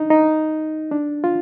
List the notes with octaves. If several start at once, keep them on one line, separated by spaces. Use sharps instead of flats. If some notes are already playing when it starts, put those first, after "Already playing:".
Already playing: D4 D#4
D#4
D4
F4